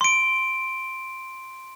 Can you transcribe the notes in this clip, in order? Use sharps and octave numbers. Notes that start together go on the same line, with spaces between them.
C6 D7